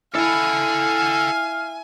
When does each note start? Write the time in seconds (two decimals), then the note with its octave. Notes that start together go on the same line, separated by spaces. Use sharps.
0.14 E4 A4 F5 F#5 G#5